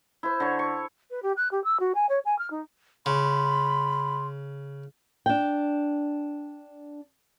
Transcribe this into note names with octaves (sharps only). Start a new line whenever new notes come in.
E4 C5
D3 C#5
C#6
B4
G4
F#6
G4
E6
F#4
G#5
C#5
G#5
F6
D#4
C#3 B5 C6
D4 G5